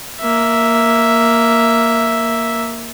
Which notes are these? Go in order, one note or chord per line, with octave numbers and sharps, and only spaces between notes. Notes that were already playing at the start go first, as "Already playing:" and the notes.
A#3 E5